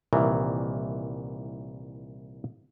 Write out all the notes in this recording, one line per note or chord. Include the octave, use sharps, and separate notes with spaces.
C2 A#2 D#3 E3